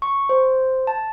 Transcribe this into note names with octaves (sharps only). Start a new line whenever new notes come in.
C#6
C5
A5